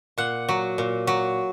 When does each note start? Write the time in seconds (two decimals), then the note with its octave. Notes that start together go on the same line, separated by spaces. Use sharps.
0.18 A#2 F#5
0.49 F#3
0.78 A#2
1.07 F#3